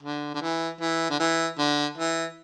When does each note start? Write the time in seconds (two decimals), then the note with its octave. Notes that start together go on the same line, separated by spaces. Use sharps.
0.03 D3
0.35 D3
0.42 E3
0.81 E3
1.10 D3
1.20 E3
1.59 D3
1.98 E3